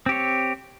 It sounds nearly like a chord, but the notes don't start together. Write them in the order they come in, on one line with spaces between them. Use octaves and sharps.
C4 G4 C#5